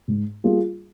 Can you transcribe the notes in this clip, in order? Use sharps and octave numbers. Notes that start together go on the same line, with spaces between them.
G#2
G3 A#3 F4 G#4